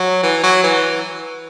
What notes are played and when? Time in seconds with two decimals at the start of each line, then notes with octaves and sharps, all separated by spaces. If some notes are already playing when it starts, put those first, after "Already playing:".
Already playing: F#3
0.23 E3
0.44 F#3
0.63 E3